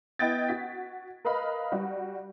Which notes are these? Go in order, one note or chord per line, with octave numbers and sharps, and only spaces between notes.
B3 E4 D#5 G5 G#6 A6
F#4 B6
A#4 B4 D#5 F5 B5
G3 F#4